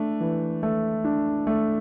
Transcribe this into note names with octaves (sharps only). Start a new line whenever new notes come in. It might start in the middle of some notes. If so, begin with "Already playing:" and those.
Already playing: A3 D4
E3
A3
D4
A3